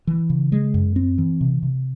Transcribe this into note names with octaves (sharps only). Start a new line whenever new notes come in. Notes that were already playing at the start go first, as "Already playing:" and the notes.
E3
C#3
G#3
F#2
C4
E3
C3
C3